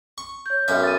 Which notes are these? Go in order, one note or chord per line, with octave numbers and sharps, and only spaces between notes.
C#6
C#5 G6
B1 F#2 E5
A6 D#7